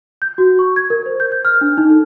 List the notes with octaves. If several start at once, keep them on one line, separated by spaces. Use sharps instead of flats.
G6
F#4
C#6
G#6
A#4
C5
G6
G6
F6
D4
D#4
A4